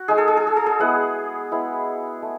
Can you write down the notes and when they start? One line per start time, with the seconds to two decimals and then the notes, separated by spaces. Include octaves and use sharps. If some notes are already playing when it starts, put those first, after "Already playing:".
Already playing: F#4
0.08 G#3 D#4 G#4
0.18 A4
0.28 G#4
0.37 A4
0.47 G#4
0.57 A4
0.66 G#4
0.79 G#3 B3 E4 F#5
1.52 G#3 B3 E4
2.22 A3